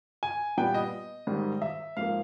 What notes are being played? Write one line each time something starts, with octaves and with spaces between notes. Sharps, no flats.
G#5
A#2 G3 B3 G5
D#5
G#2 D#3 G3
E5
G#2 F3 A#3 F5